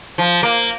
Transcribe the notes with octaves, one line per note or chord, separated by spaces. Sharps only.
F3
A#3